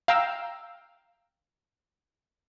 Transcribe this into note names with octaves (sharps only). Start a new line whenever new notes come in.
F5 G5 A#5 E6